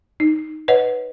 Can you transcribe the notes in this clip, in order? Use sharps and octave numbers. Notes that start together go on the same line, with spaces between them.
D#4
B4 C#5 D#5 F#5